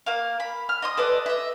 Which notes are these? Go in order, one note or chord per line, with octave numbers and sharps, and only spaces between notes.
A#3 F5
B5
F6
D#5 C6 D#6
A4 B4 D5 D#5
D#5 E5